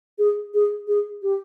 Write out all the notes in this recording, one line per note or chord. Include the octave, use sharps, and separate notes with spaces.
G#4
G#4
G#4
G4